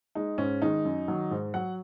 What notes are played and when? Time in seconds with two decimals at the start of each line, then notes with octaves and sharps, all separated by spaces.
0.15 G#3 D#4
0.38 G#2 C#4
0.62 D#3 G#3 D#4
0.85 F#2
1.08 D#3 F#3
1.31 G#2
1.54 F#3 F#5